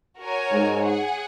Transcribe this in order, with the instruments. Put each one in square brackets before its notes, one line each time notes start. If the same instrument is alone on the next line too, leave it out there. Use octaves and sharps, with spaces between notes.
[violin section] F#4 A#4 C#5 G#5
[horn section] G#2
[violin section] G#4 F#5